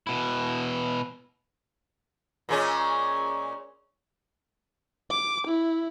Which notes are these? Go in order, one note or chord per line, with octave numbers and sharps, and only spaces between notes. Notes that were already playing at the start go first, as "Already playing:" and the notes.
B2 E4
A#2 G#3 C#4
D6
E4